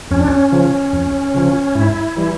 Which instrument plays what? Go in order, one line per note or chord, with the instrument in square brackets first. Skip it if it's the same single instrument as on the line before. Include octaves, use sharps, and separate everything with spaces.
[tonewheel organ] F2 C#4
D4
C#4
C#3 F3
F2
C#3 F3
G#2 E4
E3 G3